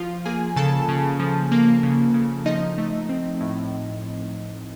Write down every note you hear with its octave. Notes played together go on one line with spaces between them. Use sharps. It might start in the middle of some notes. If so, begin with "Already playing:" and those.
Already playing: F3 F4 F5
A#3 G#4 G#5
C#3 A4 A5
C#3
F3
A#3
C#3
C#3
F3 D#4 D#5
A3
C4
A2